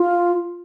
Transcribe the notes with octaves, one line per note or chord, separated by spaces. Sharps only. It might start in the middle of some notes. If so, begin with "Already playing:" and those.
Already playing: F4